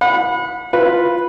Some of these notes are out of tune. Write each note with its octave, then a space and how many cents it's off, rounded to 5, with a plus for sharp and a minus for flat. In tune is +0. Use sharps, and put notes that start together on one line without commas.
F#5 -35 B5 +0
F4 +0 B4 -5